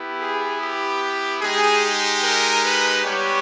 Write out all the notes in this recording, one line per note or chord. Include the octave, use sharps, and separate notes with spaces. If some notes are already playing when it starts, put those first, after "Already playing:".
Already playing: B3 E4 G4
G#4
G4
G#3 D#4 G4 G#4
A#4
B4
G3 B3 G4 C#5